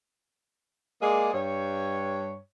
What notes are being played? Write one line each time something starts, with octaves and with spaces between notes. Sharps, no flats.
G#3 A#3 G#4 D5 D#5
G2 C#5